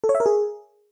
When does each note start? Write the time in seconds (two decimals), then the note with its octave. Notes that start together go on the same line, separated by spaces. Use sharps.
0.04 A4
0.09 C#5
0.15 E5
0.20 A#4
0.26 G#4